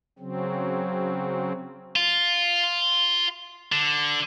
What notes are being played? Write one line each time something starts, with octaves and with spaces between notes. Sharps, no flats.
C#3 F#3 C4
F4
D3